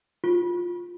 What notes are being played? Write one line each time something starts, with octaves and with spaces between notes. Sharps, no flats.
F4